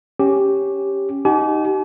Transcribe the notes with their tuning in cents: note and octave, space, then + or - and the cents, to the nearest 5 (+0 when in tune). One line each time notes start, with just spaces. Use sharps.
C#4 +0 G4 +0
D#4 +0 G4 -30 G#5 +45